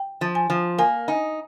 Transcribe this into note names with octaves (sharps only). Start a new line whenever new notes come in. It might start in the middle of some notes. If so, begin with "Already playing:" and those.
Already playing: G5
F3
G#5
F3
A#3 G#5
D#4 G#5